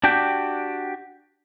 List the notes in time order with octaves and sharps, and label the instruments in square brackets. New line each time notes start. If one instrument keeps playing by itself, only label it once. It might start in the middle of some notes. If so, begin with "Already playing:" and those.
[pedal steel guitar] D4 F#4 G4 G5